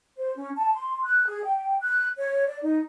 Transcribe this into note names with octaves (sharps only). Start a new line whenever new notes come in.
C5
C#4
A5
C6
F#6
G#4
G5
F#6
C#5
D5
D#4